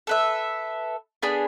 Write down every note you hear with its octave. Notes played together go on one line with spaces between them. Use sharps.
A4 B4 E5
B3 D4 G#4 B5